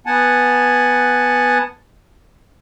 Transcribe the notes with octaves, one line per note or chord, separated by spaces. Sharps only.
B3 F#5 G#5 A5